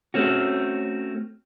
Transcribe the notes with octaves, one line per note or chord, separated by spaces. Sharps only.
A3 C4 C#4 F#4